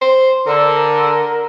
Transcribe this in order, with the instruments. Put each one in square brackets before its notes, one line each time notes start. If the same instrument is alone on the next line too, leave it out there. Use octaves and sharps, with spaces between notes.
[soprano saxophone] C5
[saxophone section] D3 [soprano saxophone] A#4